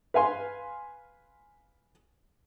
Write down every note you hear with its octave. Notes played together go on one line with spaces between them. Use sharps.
B4 F5 G#5 C6